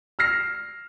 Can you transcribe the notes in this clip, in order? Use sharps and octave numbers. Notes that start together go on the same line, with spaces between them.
E6 F6 A#6 C7